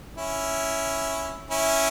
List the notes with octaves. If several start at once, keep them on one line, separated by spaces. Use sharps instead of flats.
C#4 E4
C#4 E4